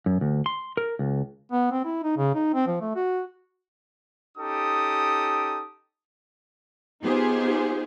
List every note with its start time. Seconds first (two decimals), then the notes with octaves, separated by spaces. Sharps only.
0.06 F#2
0.21 D2
0.46 C6
0.77 A#4
0.99 C#2
1.52 B3
1.71 C4
1.84 E4
2.03 D#4
2.17 C#3
2.34 D#4
2.53 C4
2.67 F3
2.81 A3
2.95 F#4
4.38 C#4 D#4 G4 A4 D#6
7.02 B3 D#4 F4 G4 G#4 C5